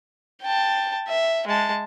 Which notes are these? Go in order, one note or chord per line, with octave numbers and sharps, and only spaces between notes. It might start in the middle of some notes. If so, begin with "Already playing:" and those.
G5 A5
E5
G#3 A5